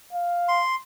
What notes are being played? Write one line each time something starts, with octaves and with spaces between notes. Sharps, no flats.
F5
C6